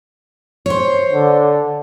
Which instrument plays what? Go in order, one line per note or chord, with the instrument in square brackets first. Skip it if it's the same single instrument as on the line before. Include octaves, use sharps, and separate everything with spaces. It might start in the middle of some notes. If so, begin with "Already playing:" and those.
[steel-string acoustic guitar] C5 C#5
[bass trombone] D3